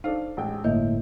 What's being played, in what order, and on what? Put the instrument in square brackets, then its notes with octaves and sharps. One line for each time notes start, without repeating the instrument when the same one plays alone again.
[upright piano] D4 A4 F5 [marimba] D#4 C5
[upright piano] A1 G#3 G5
[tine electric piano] G1 A2 [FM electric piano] A#3 [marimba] D#5 E5 [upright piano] G6